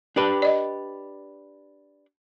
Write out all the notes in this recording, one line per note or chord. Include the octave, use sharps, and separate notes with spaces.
D4 G4 B4
D5 D#5